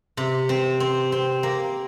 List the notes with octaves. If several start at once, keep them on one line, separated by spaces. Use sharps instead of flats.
C3
C4
C4
C4
A#3